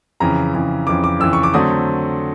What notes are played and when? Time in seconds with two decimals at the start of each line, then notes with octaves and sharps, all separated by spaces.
0.20 F2 C#3 E3 A#5
0.54 F2 C#3 E3
0.87 F2 C#3 E3 D6
1.04 D6
1.20 F2 C#3 E3 E6
1.33 C#6
1.43 D6
1.54 D3 F#3 A3 C4 D#6